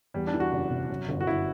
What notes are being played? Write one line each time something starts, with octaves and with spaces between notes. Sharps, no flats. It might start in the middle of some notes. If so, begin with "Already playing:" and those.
E2 G3
D4
E3
F#4
F#1
C3
F#2
G1
F#4
G1 E4